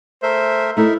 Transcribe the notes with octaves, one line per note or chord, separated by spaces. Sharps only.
A3 A#4 C5 E5
A3 D#4 E4 A#4 E5